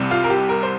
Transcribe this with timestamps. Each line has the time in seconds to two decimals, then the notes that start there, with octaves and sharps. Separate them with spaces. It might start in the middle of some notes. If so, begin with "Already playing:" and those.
Already playing: C2 C3 G3
0.11 F4
0.24 A#4
0.30 G4
0.49 A#4
0.63 C5